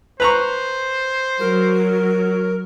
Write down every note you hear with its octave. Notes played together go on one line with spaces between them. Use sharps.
B4 C5 A#5 C#6
F#3 A#4